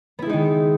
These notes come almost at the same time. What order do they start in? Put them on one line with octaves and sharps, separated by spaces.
B3 E4 G#3 D#4 D#3